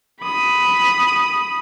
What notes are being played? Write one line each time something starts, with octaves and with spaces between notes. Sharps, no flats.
B5 D#6